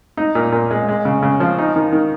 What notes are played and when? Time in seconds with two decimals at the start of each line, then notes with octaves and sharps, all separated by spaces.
0.17 D#4
0.35 A#2
0.52 A#2
0.71 G#3
0.88 G#3
1.05 C#3
1.22 C#3
1.40 F3
1.58 D#4
1.76 D#3
1.92 D#3